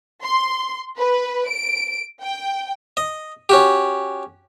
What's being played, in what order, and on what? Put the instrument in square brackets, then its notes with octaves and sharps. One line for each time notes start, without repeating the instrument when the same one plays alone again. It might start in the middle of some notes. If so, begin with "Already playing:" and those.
[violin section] C6
B4
D7
G5
[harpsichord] D#5
C#4 F#4 G4